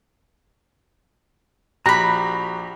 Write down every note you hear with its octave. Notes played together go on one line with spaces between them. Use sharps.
A#1 F#4 G4 A#5 B5 A#6